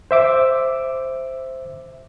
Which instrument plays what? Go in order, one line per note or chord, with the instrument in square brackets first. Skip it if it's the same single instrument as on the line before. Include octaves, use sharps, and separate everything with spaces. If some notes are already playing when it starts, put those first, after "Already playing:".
[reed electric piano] C5 E5 D6